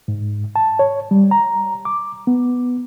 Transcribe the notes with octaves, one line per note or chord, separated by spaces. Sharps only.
G#2
A5
C#5
G3
A#5
D6
B3